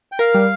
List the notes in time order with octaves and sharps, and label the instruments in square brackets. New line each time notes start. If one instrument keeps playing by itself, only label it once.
[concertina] G5
[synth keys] A#4 [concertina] F5
[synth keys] G3